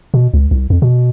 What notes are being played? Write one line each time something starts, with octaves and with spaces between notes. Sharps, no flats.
B2
C#2
C2
F2
B2